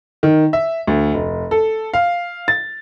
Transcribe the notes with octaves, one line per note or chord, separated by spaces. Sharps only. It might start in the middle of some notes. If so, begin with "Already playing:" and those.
D#3
E5
D2
F1
A4
F5
A6